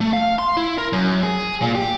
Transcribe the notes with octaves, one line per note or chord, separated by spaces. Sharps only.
A3
F5
C6
E4
A#4
F#2
G#4
A#2
G4